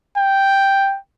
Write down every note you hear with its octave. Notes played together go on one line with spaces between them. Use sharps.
G5